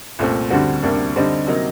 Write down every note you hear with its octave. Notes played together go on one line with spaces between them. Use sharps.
C2 A#2 A3 C4
D2 D3 G3 C4 F#4
D2 C3 G3 A#3 D4
D3 G3 C4 D#4
C3 F#3 A#3 D#4